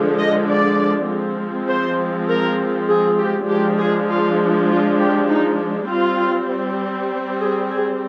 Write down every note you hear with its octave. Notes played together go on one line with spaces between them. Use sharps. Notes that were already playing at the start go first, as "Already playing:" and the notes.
Already playing: D3 F3 G#3 D4
D#5
D5
F3 G#3 C4
C5
A#4
G#4
G4
F3 G#3 D4 G4
G#4
F4
F4
G4
D#4
G3 C4 F4
G#4
G#4